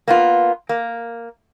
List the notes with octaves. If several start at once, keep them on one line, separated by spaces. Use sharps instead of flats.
A#3 B3 F4
A#3